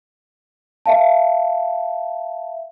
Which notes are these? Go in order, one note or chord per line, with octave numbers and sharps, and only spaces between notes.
E5 F5 A5